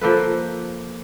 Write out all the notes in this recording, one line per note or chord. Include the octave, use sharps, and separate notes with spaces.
F3 A#3 A4 B4